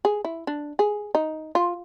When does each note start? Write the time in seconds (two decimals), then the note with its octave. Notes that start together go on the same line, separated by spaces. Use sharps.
0.05 G#4
0.25 E4
0.47 D4
0.79 G#4
1.15 D#4
1.55 F4